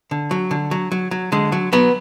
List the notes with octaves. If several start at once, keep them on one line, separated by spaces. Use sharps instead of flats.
D3
F#3
D3
F#3
F#3
F#3
D3 G#3
F#3
F#3 B3